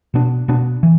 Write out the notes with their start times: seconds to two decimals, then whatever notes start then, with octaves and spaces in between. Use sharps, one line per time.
0.14 B2 B3 D4
0.48 B2 B3 D4
0.83 E3